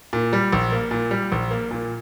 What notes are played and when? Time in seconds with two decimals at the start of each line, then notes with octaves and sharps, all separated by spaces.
0.13 A#2
0.33 G3
0.53 A#1
0.72 A#3
0.91 A#2
1.11 G3
1.32 A#1
1.51 A#3
1.71 A#2